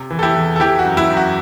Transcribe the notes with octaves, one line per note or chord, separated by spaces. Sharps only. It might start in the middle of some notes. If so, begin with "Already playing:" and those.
Already playing: C3
E3
A4
E4 G4
E2
A4
E3 E4 G4
F#4
F#2
E4
F#2
F#4